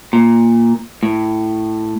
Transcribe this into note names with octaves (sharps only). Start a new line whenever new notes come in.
A#2
A2